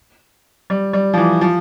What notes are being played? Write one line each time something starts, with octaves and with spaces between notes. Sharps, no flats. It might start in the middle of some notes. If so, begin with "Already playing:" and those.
G3
G3
F3
E3
F3